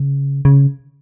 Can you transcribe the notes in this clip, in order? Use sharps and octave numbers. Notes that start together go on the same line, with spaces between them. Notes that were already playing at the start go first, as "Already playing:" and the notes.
Already playing: C#3
C#3